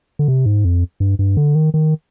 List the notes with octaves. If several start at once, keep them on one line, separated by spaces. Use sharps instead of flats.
D3
C3
G#2
F2
G2
G2
D3
D#3
D#3